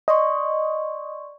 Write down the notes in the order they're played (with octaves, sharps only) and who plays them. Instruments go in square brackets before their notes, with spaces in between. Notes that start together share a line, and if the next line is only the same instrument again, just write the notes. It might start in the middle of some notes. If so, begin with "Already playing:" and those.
[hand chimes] D5 C6 C#6 [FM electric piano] D#5